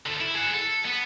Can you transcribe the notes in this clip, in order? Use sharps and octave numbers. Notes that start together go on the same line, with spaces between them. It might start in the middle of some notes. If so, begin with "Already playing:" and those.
D3 A3
E4
G#4 F#5
A4
B3